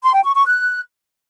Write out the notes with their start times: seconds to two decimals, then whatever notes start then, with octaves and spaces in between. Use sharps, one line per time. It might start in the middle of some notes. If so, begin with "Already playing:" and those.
0.03 C6
0.13 G5
0.24 C#6
0.35 C#6
0.46 F#6